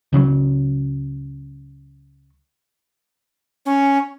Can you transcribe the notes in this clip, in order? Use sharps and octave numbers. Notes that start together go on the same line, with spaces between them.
C#2 C#3 F3 F#3
C#4